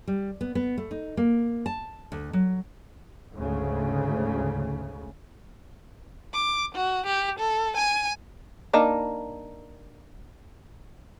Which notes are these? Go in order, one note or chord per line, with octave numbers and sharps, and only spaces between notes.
G3
B3
B3
A3
D#4
A#3
A5
D2
F#3
D2 G#2 C#3
D6
F#4
G4
A4
G#5
A#3 D4 D#4